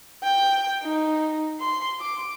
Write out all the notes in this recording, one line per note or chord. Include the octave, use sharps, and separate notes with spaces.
G5
D#4
C6
D6